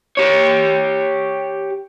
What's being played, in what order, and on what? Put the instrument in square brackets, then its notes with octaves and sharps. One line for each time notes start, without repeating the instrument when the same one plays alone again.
[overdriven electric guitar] G4 C#5